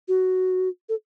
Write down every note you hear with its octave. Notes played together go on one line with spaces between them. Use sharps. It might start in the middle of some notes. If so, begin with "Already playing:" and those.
F#4
A4